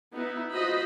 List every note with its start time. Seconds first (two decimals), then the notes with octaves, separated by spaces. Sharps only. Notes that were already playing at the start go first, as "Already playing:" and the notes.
0.12 B3 D#4 E4
0.54 F4 F#4 C5 D#5 B5